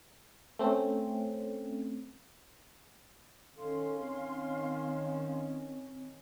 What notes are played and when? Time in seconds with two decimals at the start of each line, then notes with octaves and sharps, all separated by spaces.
0.59 A3 C4 C#4
3.57 D#3 C#4 A4 F5 C6
4.00 C4